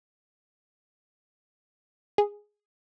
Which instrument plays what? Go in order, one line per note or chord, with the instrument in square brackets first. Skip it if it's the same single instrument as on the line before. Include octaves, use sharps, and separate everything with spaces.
[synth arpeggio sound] G#4